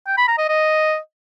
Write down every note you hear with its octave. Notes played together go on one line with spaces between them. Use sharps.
G5
B5
A#5
D#5
D#5